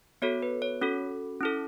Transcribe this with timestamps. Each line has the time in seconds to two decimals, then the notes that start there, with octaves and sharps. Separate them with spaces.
0.22 B3 F#4 A4 C#5
0.42 B4
0.62 C#5
0.81 C#4 F#4 A4
1.41 C#4 E4 A4